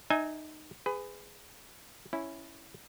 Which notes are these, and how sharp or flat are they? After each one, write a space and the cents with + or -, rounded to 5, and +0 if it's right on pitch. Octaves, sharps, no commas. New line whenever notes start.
D#4 -20 E5 -35 G#5 +0
G#4 -10 B4 +25
C#4 +0 E4 +0